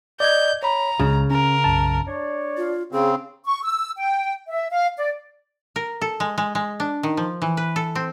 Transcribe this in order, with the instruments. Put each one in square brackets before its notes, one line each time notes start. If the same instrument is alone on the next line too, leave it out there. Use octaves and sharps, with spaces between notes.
[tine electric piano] D5 D#5 G#6 [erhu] G6
[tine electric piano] C#5 B5 [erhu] A#5
[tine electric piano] C#2 G#3 [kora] C#3
[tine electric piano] C#4 [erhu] A#4
[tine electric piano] B1 F#2 A5
[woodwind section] D4 C#5 D5
[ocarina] F4
[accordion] C#3 C4 [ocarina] G#4
[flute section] C#6
E6
G5
E5
F5
D5
[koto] A#4
A4
G#3
G#3
G#3
D4
D#3
F3
E3
B4
A4
C4